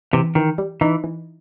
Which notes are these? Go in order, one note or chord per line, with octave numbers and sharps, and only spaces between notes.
C3 E3
D#3 E3
G3
E3 D#4
E3